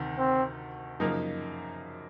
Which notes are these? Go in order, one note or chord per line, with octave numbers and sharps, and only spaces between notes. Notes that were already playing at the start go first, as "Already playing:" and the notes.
Already playing: D2 C3 D#3
C4
F#2 C#3 F3 A#3 D#4